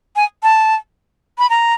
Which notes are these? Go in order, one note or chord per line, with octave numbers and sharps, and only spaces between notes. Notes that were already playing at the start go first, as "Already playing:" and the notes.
G#5
A5
B5
A#5